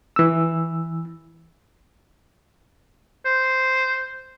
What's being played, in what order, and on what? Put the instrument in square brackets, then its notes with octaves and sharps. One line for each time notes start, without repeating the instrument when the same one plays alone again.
[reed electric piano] E3 E6
[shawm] C5